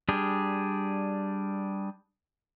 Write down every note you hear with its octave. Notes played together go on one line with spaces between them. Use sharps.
G3 D4 G#4